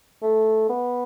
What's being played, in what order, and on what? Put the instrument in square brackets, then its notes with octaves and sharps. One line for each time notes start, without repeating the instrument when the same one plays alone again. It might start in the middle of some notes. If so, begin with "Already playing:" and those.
[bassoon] A3
B3